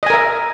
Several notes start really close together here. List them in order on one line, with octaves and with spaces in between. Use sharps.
D#5 G#5 A#4 E5